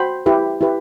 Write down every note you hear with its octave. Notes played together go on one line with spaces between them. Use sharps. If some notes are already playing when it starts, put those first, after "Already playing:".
Already playing: F#4 C5 G5 B5
E4 G4 B4
E4 G4 B4